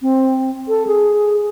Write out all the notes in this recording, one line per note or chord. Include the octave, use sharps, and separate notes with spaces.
C4
A4
G#4